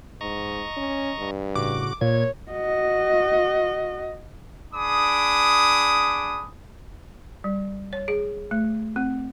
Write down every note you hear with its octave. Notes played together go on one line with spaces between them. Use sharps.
G#2 D#5 A#5 C#6
C#4
G2
A2 C#3 F#4 D6
A#2 C#5 G#6
F#4 D#5
D4 G#4 B5 D6 D#6
G3
C#5
G#4
A3
C4